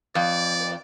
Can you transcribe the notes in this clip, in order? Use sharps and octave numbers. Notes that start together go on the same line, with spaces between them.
F2 D5